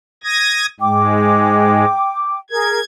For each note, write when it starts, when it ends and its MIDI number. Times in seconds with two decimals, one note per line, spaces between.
0.24 0.66 87
0.24 0.66 92
0.24 0.66 94
0.80 1.85 44
0.80 1.85 56
0.80 2.38 79
0.80 2.38 86
2.50 2.79 68
2.50 2.79 70
2.50 2.85 92